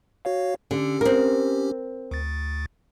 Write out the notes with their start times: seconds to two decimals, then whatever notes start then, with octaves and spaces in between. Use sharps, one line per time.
0.25 F#4 C#5 F5
0.71 D3 C#4 G4
1.01 C4 A#4
2.11 D2 A6